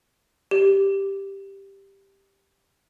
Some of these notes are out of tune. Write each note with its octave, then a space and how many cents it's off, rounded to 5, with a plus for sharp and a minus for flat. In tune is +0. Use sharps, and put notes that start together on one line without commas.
G4 +0